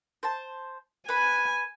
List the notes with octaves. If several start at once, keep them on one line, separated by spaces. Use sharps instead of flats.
C5 A5
B4 G#5 B5